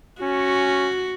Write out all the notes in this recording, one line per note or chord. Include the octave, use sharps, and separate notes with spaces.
C#4 F#4